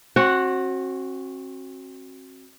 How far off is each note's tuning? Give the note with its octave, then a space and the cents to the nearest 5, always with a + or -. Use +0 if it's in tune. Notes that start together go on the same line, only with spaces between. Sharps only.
C4 +40 F#4 +0 F#5 +0